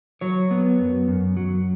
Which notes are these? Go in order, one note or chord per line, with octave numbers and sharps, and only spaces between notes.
F#3 C#5
B3
F#2
F#2
F#3